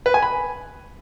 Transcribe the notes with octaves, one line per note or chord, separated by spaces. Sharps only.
B4
G#5
B5